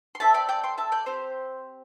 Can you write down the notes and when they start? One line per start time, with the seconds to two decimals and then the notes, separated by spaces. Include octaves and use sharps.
0.15 C6
0.20 A3 C4 A4 E5 A5
0.34 D5 G5
0.49 D5 G5
0.63 G5 C6
0.78 E5 A5
0.92 D5 G5
1.06 C4 G4 C5